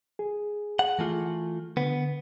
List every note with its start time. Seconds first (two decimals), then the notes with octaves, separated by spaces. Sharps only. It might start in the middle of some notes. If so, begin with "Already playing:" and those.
0.19 G#4
0.79 F#5
0.99 E3 A3 F4
1.77 D3 B3